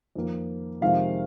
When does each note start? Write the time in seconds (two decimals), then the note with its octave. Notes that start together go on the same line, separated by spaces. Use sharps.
0.15 F2 D#3 A#3
0.81 F2 C3 D#3 G#3 F5